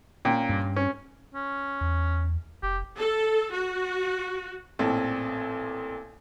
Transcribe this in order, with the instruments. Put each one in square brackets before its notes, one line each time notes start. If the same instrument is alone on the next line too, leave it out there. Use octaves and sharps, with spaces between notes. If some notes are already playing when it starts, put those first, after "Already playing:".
[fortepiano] A#2 [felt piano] C#4 G5
[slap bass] G2
[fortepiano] C#4
[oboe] C#4
[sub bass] E2
[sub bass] F1 [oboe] G4
[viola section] A4
F#4
[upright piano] A1 A#2 C4 A4